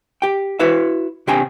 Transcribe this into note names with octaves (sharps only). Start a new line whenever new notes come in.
G4 G5
E4 F#4 B4 E5 F5
C3 D4 G4 G5 G#5 A#5